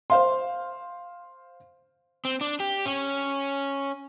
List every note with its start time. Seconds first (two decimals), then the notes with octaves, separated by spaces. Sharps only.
0.10 C5 F5 C6
2.25 C4
2.41 D4
2.60 G4
2.86 C#4